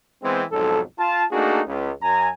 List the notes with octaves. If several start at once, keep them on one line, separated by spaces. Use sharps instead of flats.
E3 G#3 B3 C4
B1 F2 G#2 F#3 A4
F4 A5
A3 A#3 D4 D#4 F#4 G#4
C#2
F#2 G#5 A#5